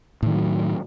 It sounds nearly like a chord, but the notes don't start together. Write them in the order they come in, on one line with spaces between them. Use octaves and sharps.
A2 D#3 F3 F#3